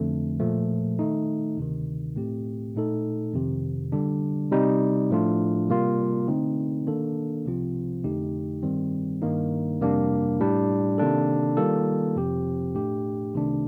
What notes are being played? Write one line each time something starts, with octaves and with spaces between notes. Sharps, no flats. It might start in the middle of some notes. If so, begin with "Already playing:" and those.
Already playing: F2 D3 A3
A#2 F3 A3
D#3 A3 D#4
D2 C3 D#3
A2 A3 C4 G4
A#2 A3 D#4 A4
F2 C3 D#3
D3 G3 D4
C3 G3 C4 D#4
A2 F3 A3 D4 F4
C3 G3 A#3 F4
D3 A3 C4 D#4
D#3 A#3 D4 A4
C2 C3 F3 C4 F4
F2 D3 A3 D#4 G4
G2 D#3 G3 C4
G2 D#3 A#3 D#4
F2 C3 G3 A#3 D4
A2 G3 D4
C3 D#3 A#3 D4 A4
D#3 G3 A#3 F4 A4
F2 C3 F3 C4 G4
A2 A3 D4 G4
C2 C3 D#3 A3 D4